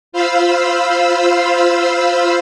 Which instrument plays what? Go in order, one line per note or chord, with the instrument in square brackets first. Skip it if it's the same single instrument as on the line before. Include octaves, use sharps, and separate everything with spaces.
[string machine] F4 C5 F5 B5 E6